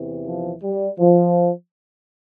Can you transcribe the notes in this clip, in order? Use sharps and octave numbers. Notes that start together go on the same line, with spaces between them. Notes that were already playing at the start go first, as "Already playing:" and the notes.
Already playing: E2 C3 E3
F3
G3
F3